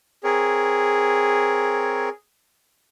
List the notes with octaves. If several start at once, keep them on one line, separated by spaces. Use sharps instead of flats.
C4 G#4 A#4 C#5